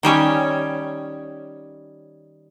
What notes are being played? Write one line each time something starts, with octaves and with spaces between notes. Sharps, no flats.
D#3 G3 C#4 C#5